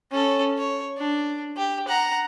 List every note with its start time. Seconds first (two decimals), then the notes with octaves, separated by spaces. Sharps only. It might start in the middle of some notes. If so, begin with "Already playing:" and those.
0.11 C#4 A4
0.58 C#5
0.98 D4
1.57 G4
1.88 F#5 A#5